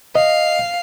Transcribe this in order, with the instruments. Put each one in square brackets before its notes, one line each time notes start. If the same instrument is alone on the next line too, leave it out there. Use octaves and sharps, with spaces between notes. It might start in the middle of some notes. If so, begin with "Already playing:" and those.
[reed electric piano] D#5 [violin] F5